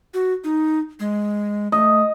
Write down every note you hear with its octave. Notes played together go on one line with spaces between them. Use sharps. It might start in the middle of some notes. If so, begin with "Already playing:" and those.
F#4
D#4
G#3
A3 D#5